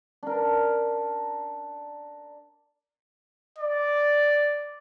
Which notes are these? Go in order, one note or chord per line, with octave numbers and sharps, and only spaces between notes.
D4 A#4
D5